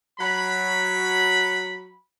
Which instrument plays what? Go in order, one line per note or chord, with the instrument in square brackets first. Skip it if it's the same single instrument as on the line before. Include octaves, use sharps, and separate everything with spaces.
[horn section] F#3 B5